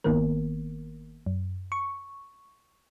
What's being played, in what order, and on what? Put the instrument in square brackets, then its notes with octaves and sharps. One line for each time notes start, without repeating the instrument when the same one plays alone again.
[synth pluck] G1 D#3 A#3 B3 A#4
F#2
C#6